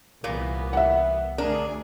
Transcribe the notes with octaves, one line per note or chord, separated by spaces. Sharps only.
C2 A#2 E3 A#3 B3
E5 F#5
D2 D4 G#4 A#4